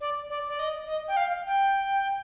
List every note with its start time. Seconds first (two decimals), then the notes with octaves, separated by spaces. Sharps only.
0.01 D5
0.30 D5
0.48 D5
0.59 D#5
0.87 D#5
1.08 G5
1.17 F5
1.47 G5